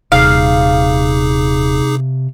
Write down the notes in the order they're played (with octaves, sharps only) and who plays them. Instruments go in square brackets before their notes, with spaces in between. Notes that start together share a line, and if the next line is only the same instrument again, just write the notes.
[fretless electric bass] D#1 [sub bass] C3 [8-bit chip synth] D#4 G#4 D6 [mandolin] F5